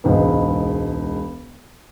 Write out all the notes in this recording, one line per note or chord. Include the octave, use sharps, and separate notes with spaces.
E1 C#2 G#2 B3 B4